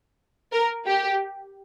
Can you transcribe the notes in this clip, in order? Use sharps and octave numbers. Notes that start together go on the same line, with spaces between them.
A#4
G4